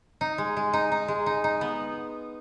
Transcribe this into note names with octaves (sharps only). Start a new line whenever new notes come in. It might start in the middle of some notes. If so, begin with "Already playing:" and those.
D#4
G#3
G#3
D#4
D#4
G#3
D#4
D#4
B3